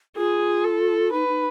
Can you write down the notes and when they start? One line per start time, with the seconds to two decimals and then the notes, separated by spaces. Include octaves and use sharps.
0.16 F4 G#4
0.64 A4
1.12 D#4 B4
1.28 D#4